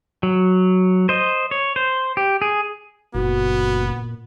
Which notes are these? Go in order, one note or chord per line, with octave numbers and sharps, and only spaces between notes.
F#3
C5 D#5
C#5
C5
G4
G#4
F#1 A#2 B3 F#4